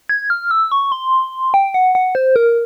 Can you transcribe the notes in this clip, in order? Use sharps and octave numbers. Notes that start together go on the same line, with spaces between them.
G#6
F6
E6
C#6
C6
G5
F#5
F#5
C5
A#4